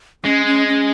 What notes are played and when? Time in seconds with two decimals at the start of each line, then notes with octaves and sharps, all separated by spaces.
0.24 G#3 C#4
0.46 C#4
0.68 C#4